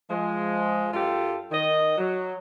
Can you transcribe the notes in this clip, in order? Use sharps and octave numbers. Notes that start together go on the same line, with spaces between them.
F3 G#3
F#2 F4 G4 A4
D#3 D#5
F#3